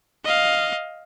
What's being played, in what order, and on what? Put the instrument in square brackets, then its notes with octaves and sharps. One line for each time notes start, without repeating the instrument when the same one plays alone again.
[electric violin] D#5 F5